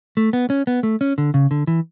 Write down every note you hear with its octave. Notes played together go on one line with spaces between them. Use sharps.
A3
B3
C#4
B3
A3
C#4
D3
C#3
D3
E3